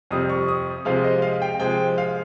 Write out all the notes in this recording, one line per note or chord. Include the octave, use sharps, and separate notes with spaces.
F2 C3 G3 D#6
C#6
D#6
C3 F3 G#3 F5
D#5
F5
G5
C3 F3 G#3 G5
F5